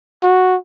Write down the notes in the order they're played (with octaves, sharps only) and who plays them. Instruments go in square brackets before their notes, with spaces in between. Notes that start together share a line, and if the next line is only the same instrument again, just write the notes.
[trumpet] F#4